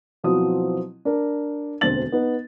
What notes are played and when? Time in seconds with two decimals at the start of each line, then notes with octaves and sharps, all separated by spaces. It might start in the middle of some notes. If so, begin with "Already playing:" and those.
0.24 B2 F3 F#3 C4 E4 D#6
1.05 D4 A#4
1.81 E1 D2 C4 A6 F#7
2.12 B3 D#4